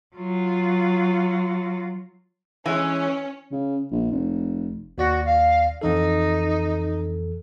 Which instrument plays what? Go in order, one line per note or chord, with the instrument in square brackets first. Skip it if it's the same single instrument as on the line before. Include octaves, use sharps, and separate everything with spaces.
[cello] F#3 F4
[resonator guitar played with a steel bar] E3 G#3 [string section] C#4
[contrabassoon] C#3
A#1
F1
[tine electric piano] D#2 D5 A#6 [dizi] F#4
[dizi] F5
[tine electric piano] F2 E3 A4 [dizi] D#4